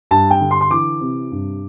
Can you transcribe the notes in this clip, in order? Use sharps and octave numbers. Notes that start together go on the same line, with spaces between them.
G2 A5
G5
D3
C6
C6
E3 D6
C3
G2